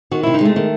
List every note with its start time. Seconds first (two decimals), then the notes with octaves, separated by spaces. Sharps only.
0.11 D#3 F#4
0.23 C3 E4
0.34 D#4
0.41 G#3 A3
0.56 D#3